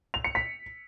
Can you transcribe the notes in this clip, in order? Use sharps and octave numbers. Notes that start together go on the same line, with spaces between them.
F7
C#7
B6